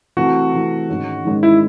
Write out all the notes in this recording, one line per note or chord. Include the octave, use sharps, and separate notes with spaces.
C3 E3 A3 C4 F#4
C3 E3 A3 C4
G#2 D#3 G#3 C#4
G#2 D#3 G#3 C#4
E4